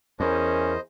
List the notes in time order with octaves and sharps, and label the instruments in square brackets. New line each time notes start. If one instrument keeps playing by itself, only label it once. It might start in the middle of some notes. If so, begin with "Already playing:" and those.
[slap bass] E2 [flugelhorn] C#4 [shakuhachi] A#4 [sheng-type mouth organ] C5 D#5